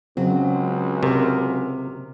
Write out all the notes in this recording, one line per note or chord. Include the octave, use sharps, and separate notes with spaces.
C#2 C#3 F#3 C4
C3 A#4